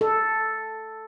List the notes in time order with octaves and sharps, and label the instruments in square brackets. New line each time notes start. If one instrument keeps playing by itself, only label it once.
[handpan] A4